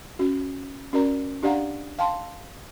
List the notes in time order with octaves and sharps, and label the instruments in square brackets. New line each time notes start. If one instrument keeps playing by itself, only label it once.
[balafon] C#4 F#4
C#4 F#4 A#4 D5 A#5
D4 G4 D5 F5 F#5 A#5
F5 G5 A5 C6